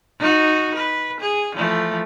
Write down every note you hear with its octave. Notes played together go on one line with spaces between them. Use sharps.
D#4 F#4
B4
G#4
E3 F3 A3